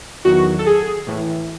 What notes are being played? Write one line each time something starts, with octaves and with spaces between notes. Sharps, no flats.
E2 D#3 F#3 F#4
A4
G#4
A2 E3